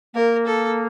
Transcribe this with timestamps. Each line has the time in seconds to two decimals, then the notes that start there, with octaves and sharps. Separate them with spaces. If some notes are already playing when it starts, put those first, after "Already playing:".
0.15 A#3 A#4
0.46 A4